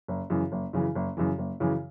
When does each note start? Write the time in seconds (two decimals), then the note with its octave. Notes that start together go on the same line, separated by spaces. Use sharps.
0.08 F#1
0.30 F#2 C#3 E3
0.52 F#1
0.73 F#2 C#3 E3
0.95 F#1
1.17 F#2 C#3 E3
1.38 F#1
1.60 F#2 C#3 E3